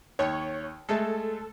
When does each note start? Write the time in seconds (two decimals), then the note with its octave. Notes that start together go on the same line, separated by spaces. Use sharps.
0.19 D#2 C#5
0.89 G#3 A3 A4